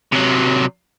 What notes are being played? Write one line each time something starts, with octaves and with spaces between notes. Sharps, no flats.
C3 F#3